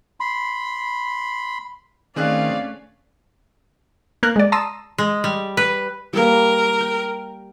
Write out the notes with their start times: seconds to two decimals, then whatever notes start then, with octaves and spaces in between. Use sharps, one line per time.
0.20 B5 C6
2.16 D#3 A3 C4 C#4 G#4 D5 F5 F#6
4.23 A#3 A#4 F#6
4.36 G#3 D5
4.52 A5 A#5 C6 D#6 E6
4.98 G#3
5.24 G3
5.57 B4
6.13 G3 A#3 A#4
6.81 G5